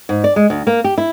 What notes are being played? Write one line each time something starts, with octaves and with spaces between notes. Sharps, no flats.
G#2
D5
G#3
D2
A#3
G4
E4